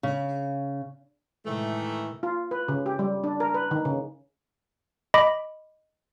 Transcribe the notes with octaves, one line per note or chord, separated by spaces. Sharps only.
C#3
A2 C3 D#3 E3 G#3 A3
F4
B4
C#3
G4
G3
D4
A#4
B4
D#3
C#3
D#5 B5 D6